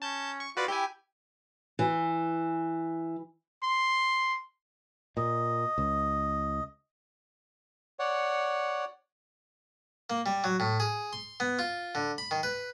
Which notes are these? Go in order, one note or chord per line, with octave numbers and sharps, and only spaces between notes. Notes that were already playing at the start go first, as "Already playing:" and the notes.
C#4 A5 G6
C#6
F4 F#4 B4 D5
E4 G4 G5 G#5
E3
C6
A#2 D#5
C#2
C#5 D5 F#5
A#3
G3
F#3
A2
G#4
C6
B3
F4
D3
B5
D#3
B4